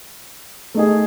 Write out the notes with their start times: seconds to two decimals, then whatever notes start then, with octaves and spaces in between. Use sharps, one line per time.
0.74 A3 D#4 G#4